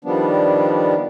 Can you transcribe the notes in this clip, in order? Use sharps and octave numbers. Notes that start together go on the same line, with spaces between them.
D#3 F3 G3 B3 D4